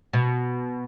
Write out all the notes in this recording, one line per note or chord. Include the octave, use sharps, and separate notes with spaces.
B2